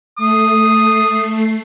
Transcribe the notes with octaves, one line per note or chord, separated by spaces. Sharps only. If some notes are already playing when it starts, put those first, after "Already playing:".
A3 D#6 C7